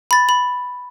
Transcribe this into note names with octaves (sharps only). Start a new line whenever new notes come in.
B5 A6
B5